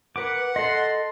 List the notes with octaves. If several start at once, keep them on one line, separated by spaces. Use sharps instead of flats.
A#4 B4 F#5 D6
A4 D#5 C6